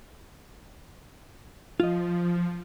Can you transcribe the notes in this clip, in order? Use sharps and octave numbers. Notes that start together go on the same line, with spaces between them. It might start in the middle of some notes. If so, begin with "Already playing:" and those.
F3 F4 D#5